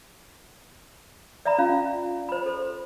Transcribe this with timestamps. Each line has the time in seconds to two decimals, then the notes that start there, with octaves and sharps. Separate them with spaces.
1.45 D5 E5 A#5 B5
1.59 C#4 F4 F5
2.29 C5 B5
2.46 A4 C5 C6